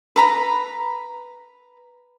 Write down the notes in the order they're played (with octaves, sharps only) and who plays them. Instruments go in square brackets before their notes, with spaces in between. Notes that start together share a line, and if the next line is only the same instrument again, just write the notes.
[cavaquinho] B4 A#5 B5